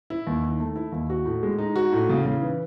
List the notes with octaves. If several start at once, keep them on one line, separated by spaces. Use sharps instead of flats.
E4
D#2
D#3
A3
E4
D#2
F#4
A2
G#3
D#4
F#4
A2
C#3
C#3
E3